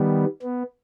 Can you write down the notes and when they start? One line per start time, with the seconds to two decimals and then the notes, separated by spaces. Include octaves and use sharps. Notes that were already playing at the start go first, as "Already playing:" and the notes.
Already playing: D#3 G3 B3
0.43 B3